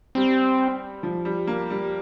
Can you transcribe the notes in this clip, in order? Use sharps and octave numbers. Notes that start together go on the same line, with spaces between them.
G3 C4
F3
G3
A#3
G3